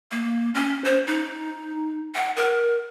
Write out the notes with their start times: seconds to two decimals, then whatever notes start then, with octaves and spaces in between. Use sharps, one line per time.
0.11 A#3
0.55 C#4
0.84 C5
1.07 D#4
2.15 F#5
2.37 A#4